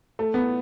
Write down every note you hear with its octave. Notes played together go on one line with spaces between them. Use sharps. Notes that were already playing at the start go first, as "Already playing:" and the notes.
A3
B3